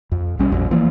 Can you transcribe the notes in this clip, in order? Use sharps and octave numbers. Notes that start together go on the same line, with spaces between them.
F2
B1 G3 C#4
A#1 F2
E3 F3 A#3